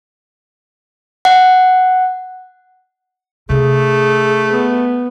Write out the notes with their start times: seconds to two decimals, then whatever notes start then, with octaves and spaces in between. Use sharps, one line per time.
1.25 F#5
3.49 C3 A3 D4 G#4
4.49 B3